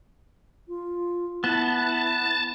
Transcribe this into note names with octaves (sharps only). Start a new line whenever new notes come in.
F4
B3 E4 A5